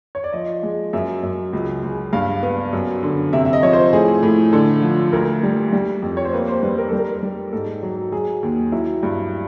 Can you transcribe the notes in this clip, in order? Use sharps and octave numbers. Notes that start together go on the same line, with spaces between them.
C#5
D5
F3 D#5
G#3
F#2 E5
F#2
C#2
C#2
G2 F5
B3
F#2
D3
C3 E5
E5
D#5
F3 C#5
C5
A2 G#4
A2
D3 A4
F3
D2 A#4
G3
G3
F2
C#5
C5
A#3 B4
C5
G3 B4
A#4
G3 A4
A#4
G3
G#2 A4
F#3
F#3 G#4
D#2
F#3 E4
G2